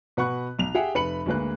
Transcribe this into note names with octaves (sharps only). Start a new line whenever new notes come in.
B2 B4 F#5 B5 C#6 F#6
B1 F7
G4 G#4 E5 F#5 G5
F1 B4 B5 C#7 F#7
D2 G#3 A#3 B4 F#6